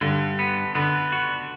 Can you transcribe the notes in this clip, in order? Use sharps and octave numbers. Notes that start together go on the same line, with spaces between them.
G2 D3
B3
D3 B3
F#4